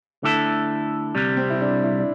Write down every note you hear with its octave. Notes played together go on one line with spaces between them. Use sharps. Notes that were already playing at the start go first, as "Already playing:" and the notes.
D3 A3 E4 A4
C2 C3 G3
C4
E4
D4
E4
D4